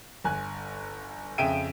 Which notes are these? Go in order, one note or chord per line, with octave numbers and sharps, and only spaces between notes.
G1 G#5 F#6
F2 C#3 E5 G5 D7 D#7